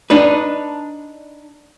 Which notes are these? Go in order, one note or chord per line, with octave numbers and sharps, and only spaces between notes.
D4 D#4 B4